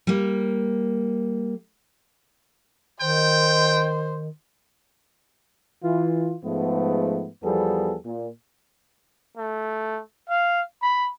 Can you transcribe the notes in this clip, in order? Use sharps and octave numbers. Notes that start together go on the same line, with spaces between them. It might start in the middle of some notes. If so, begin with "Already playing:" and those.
G3 A#3
D#3 C5 G5
E3 F4
G#2 F3 G#3 A3 B3
E2 F3 G3 B3 G#4 A4
A#2
A3
F5
B5